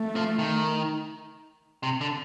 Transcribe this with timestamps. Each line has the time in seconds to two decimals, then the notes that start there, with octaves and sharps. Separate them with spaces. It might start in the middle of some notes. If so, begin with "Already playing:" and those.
Already playing: A3
0.16 F3
0.39 D#3
1.83 C3
2.01 D3